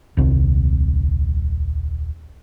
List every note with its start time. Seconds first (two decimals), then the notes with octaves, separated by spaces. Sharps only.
0.17 D#1 C2